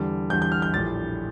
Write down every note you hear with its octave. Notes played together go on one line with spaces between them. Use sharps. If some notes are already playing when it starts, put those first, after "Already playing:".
Already playing: E2 D3 G3
E2 D3 G3 G6
G6
F6
G6
A#1 A2 G3 A6